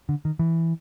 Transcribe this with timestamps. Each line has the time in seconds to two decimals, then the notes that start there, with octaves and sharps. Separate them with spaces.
0.09 D3
0.25 D#3
0.39 E3